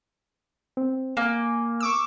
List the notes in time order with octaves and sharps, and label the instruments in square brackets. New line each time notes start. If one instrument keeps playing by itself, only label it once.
[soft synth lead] C4
[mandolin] A#3 [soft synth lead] G#5
[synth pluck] C#6 D6 E6